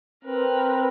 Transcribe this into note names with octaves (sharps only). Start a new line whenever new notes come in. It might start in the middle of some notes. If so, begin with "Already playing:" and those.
C4 A#4 B4